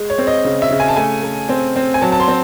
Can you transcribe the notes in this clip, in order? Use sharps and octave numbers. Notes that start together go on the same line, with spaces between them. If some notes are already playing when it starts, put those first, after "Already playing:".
Already playing: G#3
C#5
C4
D#5
C#3
E5
C#3
G#5
A5
A3 G#5
A3
C4
C4
G#5
F#3 A5
A5
C6
C4